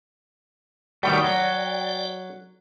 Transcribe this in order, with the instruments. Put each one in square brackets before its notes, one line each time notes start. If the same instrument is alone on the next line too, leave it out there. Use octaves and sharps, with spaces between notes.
[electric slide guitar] D#3 G3 A3 [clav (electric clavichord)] F#4 B4 C#5 [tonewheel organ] D5 G5
[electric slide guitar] F#3